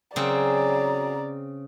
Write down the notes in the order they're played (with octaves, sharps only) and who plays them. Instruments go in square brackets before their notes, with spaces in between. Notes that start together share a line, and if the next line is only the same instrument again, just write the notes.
[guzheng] C#3 C4 [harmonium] F#3 G#4 [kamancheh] D5 A#5